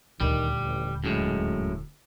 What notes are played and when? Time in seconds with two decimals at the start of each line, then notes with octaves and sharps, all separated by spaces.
0.20 D#1 D2 D#3 G3
0.65 A1
1.04 F#2 A2 G#3